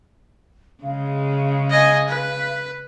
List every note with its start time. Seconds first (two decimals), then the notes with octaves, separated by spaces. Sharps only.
0.84 C#3 G#3 F5
1.70 D#5 G#5
2.09 B4